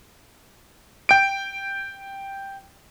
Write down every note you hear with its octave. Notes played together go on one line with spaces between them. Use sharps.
G5 D7